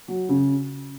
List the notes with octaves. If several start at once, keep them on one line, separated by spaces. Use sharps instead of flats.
F#3
C#3